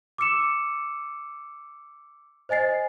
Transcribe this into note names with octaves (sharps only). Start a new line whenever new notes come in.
D6 E6 C#7 E7
C5 D#5 G#5 A6 C7